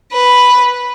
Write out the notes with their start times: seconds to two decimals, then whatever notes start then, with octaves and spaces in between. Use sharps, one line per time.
0.13 B4